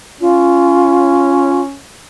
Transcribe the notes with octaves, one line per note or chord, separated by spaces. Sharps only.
C#4 F4